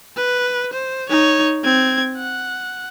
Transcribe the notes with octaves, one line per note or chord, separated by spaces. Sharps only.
B4
C5
D#4 C#5
C4 G#6
F#5